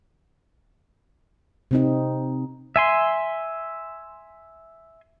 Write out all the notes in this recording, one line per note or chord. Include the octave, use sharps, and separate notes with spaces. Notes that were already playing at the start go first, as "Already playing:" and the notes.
C3 C4 D#4
E5 G#5 C6